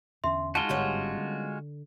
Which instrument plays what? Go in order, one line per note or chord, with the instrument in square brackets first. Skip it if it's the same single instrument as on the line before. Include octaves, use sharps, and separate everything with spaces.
[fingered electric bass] E2 D3 C#4 [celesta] E5 C6
[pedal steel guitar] G#3 F4 F#4 [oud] D#4 [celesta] A5 G7
[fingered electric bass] G1 G#2 D3 [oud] G3 B3 C#4
[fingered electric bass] D3